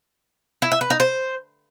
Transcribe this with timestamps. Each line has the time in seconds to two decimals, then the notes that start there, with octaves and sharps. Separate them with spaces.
0.62 E4
0.72 E5
0.81 B4
0.90 D#4
1.00 C5